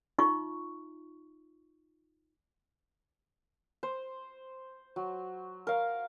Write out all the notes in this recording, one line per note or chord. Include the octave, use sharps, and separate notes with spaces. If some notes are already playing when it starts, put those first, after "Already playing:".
D#4 F4 C#6
C5
F#3
A#4 F5